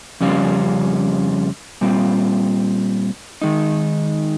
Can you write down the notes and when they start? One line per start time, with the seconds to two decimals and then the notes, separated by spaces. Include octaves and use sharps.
0.21 F2 C#3 G3 C#4 F4
1.81 A#2 G3 C4 F4
3.42 D#3 G#3 D#4